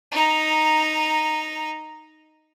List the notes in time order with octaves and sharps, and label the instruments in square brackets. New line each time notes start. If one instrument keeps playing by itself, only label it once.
[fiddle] D#4 A#5